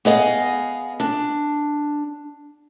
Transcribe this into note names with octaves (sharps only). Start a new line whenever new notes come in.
B3 G#4 D#5 F5
D4